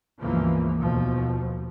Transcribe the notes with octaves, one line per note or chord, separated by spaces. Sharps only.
C#2 G2 B2 E3 F3 A#3
D#2 B2 F3